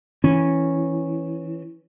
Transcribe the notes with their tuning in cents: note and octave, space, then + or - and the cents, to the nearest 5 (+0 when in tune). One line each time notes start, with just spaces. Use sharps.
E3 -5 C#4 -10